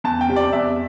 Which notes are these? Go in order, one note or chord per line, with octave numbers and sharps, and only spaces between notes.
E2 A5
G5
C3 G3
D5
E2 E5